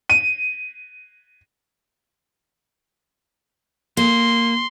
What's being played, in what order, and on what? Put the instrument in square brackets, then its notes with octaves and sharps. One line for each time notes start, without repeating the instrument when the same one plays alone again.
[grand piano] D#7
[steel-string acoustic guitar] A#3 [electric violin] C6